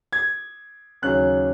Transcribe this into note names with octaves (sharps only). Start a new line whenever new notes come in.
G#6
D#2 C#3 F#3 C#4 F#6